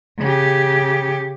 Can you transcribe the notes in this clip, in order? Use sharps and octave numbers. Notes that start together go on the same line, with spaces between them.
C#3 G4